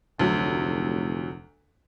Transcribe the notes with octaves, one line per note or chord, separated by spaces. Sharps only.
F1 D2 F#3